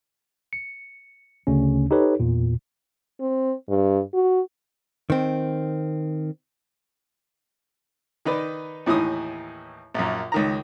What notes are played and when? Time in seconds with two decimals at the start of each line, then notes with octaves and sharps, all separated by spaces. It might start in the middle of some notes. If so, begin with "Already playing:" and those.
0.53 C#7
1.47 D2 C#3 C#4
1.91 D#4 G4 A4 B4 C#5
2.20 E2 A#2
3.20 C4
3.69 G2
4.14 F#4
5.10 D#3 C4
8.25 D#3 D#4 B4 D5
8.86 D#2 A2 E3 D#4 D#6
9.94 A#1 F#2
10.32 C#2 D#3 A#5